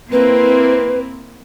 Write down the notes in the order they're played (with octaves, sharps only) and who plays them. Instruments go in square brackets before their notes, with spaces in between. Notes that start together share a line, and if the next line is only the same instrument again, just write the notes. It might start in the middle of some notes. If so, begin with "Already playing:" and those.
[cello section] A#3 C4 E4 [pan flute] B4